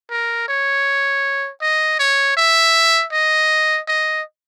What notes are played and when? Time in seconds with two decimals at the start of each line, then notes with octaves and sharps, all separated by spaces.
0.11 A#4
0.48 C#5
1.62 D#5
2.00 C#5
2.37 E5
3.12 D#5
3.88 D#5